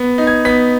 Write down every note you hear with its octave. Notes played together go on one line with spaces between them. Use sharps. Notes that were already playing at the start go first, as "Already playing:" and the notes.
Already playing: B3
D#4
G#6
B3 B6